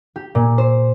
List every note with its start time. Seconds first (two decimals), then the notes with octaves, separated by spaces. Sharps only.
0.16 G4
0.35 A#2
0.58 C5